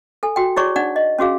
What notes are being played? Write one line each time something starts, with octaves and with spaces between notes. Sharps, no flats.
A4 G#5
F#4 G5
E4 F#4 G#4 C#5 D5 C#6
D4 D#4 D5 F#5
D#5
C#4 F#4 G#4 F5